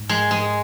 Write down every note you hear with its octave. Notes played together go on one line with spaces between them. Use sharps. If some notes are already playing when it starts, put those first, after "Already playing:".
Already playing: G#2
G#3
G#3